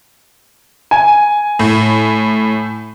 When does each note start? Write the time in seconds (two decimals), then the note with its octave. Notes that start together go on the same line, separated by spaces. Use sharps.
0.91 G#5
1.59 A2